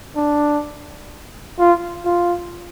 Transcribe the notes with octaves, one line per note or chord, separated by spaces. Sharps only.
D4
F4
F4